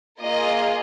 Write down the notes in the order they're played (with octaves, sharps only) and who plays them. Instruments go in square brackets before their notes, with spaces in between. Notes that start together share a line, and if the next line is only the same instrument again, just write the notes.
[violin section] A#3 F4 G#4 D#5